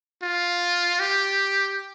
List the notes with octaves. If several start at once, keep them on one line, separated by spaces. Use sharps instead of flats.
F4
G4